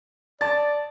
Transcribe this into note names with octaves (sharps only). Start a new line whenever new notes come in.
D5 A5 A6